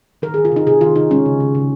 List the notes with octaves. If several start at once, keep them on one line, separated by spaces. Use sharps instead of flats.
D#3 A#4
G#4
D#3
F4
C3 D#4
C3 G#4
D#3 F4
C3 D#4
G#3 C#4
C#3
C#3
C#3